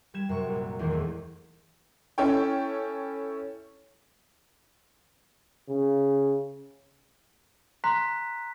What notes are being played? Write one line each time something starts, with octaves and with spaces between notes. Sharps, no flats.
G3 G#6 E7
F#2 C3 C#6
A#1
E2 D#3 E3 G#3 A#3
E1 A3
C#4 E4 A4 C#5 G5
C#3
A#5 C6 F#6 B6